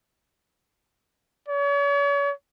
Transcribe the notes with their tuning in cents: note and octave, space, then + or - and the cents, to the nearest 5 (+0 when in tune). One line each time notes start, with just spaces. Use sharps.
C#5 +40